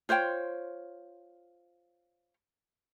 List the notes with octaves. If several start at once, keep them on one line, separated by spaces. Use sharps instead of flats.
F4 C5 C#5 G5